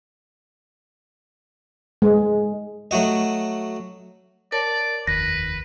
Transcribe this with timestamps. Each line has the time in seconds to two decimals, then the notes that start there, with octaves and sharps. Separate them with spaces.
2.02 G#3
2.91 F#3 A3 F#4 D#5
4.52 A#4 C#5 D5 A5
5.07 F1 D#2 B4 A#6